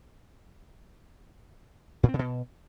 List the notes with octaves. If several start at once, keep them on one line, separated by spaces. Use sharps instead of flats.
A#2
C4
C#3
B2